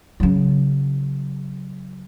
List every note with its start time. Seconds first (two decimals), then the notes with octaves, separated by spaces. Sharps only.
0.20 C#3 F#3